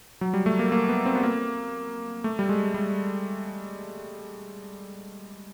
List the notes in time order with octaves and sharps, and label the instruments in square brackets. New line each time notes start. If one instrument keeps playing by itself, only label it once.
[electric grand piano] F#3
G3
A3
A#3
A#3
B3
C4
B3
A#3
A3
G3
G#3
G3